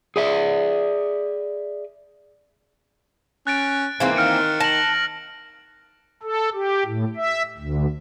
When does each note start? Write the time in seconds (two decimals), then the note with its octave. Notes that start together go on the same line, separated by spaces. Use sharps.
0.16 G#4 D5 E5
3.47 C#4 F#6 A6 D7
4.00 G#2 E3 A#3 C4
4.16 D#3 F6 C#7 D7
4.60 A5 A#6 F#7
6.23 A4
6.54 G4
6.86 A2
7.16 E5
7.58 D2